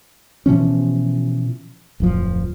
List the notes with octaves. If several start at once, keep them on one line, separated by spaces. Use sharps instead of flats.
B2 E3 F3 C#4
D1 F2 F3